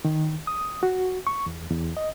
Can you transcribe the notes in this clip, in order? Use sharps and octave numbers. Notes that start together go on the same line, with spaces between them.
D#3
D#6
F#4
C#6
E2
E2
D#5